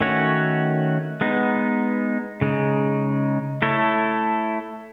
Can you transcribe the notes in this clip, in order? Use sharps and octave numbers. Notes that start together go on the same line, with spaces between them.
D#3 A3 C#4 F#4 C#5
G#3 B3 D#4
C#3 G#3 D#4
A3 E4 A4 C#5